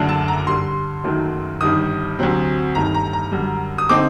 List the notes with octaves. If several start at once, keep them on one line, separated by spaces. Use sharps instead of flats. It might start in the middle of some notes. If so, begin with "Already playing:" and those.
Already playing: F#1 F#2 D3 A3 D4
A5
A#5
G2 D3 G3 C6
F#1 F#2 D#3 F#3 A3
G1 G2 D#3 D#6
D2 C3 F#3 C4
G1 G2 D#3 A3 A#5
A#5
A#5
F#2 D3 G3
D#6
D3 A3 C4 D#4 D6